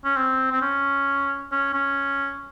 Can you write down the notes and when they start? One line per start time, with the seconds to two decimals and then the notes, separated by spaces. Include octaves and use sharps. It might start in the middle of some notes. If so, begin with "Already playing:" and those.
0.05 C#4
0.16 C4
0.51 C4
0.62 C#4
1.52 C#4
1.73 C#4